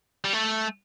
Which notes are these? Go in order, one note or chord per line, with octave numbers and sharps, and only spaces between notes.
G3
A3